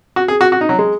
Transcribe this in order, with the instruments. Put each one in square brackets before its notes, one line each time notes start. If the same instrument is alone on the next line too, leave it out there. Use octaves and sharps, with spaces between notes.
[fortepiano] F#4
G#4
F#4
F#4
D#4
F#3
G#3